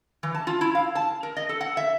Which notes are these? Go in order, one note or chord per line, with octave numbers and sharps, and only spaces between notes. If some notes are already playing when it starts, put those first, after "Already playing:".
E3
A5
F4
E4
F5
A5
A#4
D#5
A4
F#5
E5